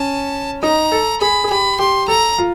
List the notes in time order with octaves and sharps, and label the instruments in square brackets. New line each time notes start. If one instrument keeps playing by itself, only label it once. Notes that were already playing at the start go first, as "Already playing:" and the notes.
Already playing: [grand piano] C#4 [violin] A5
[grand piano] D#4 [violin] A#5
[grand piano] A4
[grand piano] G#4 [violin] B5
[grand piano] G#4
[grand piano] G4 [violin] B5
[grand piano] G4 [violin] C6
[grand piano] A4 [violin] A#5
[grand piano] F4